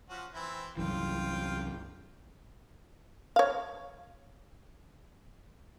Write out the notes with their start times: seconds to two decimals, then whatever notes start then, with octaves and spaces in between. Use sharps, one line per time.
0.10 F3 C#4 F#4
0.34 E3 C4 E4
0.77 C2 F#2 E3 F4 G5
3.36 C#5 F5